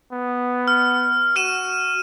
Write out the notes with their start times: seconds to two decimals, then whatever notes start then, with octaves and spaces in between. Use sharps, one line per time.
0.12 B3
0.68 F6
1.36 F#4 F6 D#7 E7